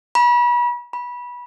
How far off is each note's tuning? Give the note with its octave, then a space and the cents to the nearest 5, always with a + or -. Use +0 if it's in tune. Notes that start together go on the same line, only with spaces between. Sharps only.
B5 -35
B5 -20